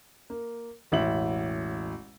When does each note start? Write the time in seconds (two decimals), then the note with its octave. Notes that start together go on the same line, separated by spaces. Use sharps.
0.30 A#3
0.92 E1 A1 E4 E5 F#7